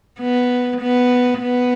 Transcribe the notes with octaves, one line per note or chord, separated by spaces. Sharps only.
B3
B3
B3